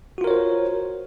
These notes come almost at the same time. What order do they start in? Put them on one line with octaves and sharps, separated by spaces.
F#4 F4 A#4 C#5 C5